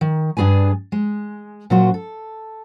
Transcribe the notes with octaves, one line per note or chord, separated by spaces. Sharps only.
D#3
G2 D4 G#4 B4 G#5
G#3
A#2 F#3 C#4 F#4 C5
A4